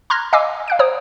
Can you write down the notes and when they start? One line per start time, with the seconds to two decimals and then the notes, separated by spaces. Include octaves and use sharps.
0.10 A#5 C6 F6 F#6 G#6 A#6
0.33 D#5 F5 G#5 D6 E6
0.68 F5 F#6 D7
0.79 C5 C#5 A#5 D#6